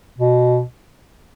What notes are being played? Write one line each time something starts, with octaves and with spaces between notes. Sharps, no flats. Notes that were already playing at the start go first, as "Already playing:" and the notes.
B2